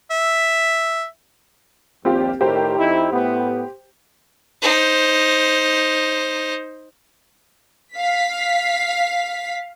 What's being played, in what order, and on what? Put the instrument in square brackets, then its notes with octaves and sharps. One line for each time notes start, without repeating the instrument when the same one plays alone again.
[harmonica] E5
[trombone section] A#1 D#2 [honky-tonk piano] C4 F4 G4
[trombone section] A2 D#3 A#4 [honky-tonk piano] G4 C5
[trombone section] F2 D#4 E4
A2 B3
[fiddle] D#4 C5
[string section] F5 B6